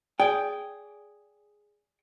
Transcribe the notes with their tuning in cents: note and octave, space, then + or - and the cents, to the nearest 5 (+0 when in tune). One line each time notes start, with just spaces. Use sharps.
G#4 +0 D5 -20 G5 +0